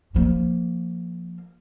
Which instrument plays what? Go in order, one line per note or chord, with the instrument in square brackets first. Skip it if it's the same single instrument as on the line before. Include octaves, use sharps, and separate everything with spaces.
[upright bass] F3 A#3